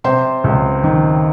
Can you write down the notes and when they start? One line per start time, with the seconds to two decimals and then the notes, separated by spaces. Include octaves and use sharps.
0.04 C3 C5 C6
0.44 C#2
0.84 D#3